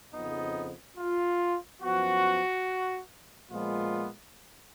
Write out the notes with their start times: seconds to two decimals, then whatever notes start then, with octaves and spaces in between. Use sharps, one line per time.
0.13 F2 C#3 F3 B3 D#4
0.98 F4
1.81 F#2 F3 B3 F#4
3.50 A#2 F3 G#3 B3 F4